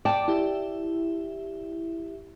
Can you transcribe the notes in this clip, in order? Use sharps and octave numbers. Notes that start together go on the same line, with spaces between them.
D5 G5 A5 D6
E4 G4 E5